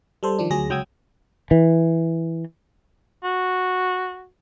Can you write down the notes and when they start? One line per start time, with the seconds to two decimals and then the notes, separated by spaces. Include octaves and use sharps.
0.23 G3 A4 C5
0.39 D#3 F3 D4
0.50 D2 F#3 G#4 A#6
0.70 C#2 F#3 G5 D#6 E6 G#6
1.51 E3
3.24 F#4